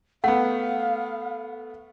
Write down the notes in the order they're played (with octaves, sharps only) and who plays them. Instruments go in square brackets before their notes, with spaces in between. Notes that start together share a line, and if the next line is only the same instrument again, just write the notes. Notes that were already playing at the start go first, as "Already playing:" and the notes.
[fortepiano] A3 B3 [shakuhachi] F5 [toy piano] F#5